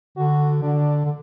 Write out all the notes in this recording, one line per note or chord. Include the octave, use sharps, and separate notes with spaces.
D3 F#4
D3 D4
D3